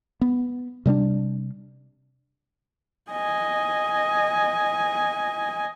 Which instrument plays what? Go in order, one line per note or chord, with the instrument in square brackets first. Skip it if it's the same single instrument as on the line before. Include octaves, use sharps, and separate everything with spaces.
[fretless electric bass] B3
C3 G3 A3 D4
[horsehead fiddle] D#5 G#5